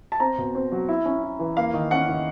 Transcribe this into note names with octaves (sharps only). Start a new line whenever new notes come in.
A5
C4 A#5
B2
C4
F#3
E4
C#4
E4
E3
A#3 F5
D#3
C#4 F#5
D#3